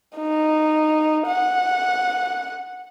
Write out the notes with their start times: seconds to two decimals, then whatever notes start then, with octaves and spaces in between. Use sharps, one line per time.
0.17 D#4
1.26 F#5